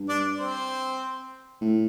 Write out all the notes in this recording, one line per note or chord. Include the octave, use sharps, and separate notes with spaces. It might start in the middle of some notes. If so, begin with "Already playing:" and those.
Already playing: G2
D4 D5
C4 C5
A2